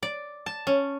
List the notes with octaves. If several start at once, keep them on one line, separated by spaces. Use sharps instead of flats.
D5
A5
C#4